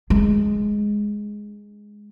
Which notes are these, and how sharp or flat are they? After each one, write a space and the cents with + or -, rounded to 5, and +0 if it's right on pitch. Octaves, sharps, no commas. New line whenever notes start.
G#3 +0 D4 +0